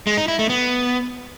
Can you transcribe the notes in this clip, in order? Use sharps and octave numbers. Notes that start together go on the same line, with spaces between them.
G#3
D#4
E4
A3
B3